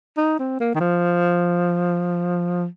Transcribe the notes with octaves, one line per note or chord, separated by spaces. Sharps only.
D#4
C4
A#3
D#3
F3